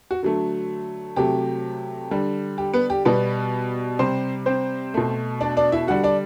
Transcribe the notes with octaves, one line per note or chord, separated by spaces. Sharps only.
F#4
D3 F#3 A3
C3 F#3 A3 G4
D3 G3
G4
B3 B4
G4
B2 G3 B3 B4
C3 G3 C4 C5
C4 C5
B2 A3
D4 D5
D4 D5
E4 E5
D3 G3 F#4 F#5
D4 D5